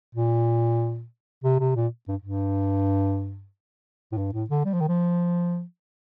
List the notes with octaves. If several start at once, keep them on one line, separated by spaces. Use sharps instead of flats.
A#2
C3
C3
A#2
G2
G2
A2
G2
A2
D3
G3
F3
D#3
F3